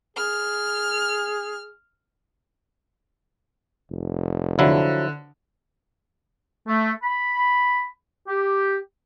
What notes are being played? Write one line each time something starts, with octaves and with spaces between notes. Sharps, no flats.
G#4 F6
F1
D3 F3 F#3 E4
A3
B5
G4